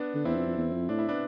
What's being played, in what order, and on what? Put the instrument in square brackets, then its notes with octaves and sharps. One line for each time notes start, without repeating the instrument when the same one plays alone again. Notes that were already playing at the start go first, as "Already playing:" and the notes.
Already playing: [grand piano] B3 D4
[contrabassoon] D3
[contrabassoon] E2 [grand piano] C4 E4
[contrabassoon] F2
F2
E2
F2
[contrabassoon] A2 [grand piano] D4
[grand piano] E4
B3 D4